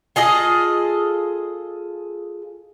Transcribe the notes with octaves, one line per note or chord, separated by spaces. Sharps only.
F4 G#4 A4 D#5